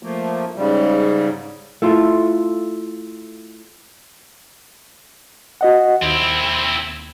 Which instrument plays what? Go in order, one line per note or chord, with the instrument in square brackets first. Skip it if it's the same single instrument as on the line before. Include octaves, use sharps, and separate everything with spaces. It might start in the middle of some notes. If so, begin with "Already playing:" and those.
[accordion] F3 A3 A#3
G#2 C#3 G3
[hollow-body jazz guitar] A3 E4 F4
[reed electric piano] F#4 D#5 F#5
[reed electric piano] D#2 [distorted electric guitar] C4 E4